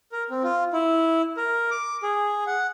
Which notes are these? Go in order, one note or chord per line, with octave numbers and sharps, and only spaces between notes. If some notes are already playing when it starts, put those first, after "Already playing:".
A#4
C4
F4
E4
A#4
D6
G#4
F#5